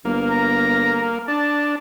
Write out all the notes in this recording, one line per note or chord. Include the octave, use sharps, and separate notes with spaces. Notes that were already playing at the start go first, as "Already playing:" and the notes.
G1 A#3
A#5
D4 A5